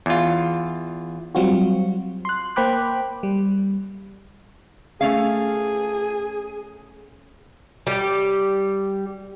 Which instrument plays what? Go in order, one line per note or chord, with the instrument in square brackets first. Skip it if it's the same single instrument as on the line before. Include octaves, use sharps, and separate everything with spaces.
[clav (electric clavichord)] E2 F4
[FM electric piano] F#3 G3 C4 F4 F#4
C6 F#6
A#3 C5 G5 B5 D6 F#6
G3
[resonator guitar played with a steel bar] A3 C#4 F5 [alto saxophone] G#4
[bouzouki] G3 G4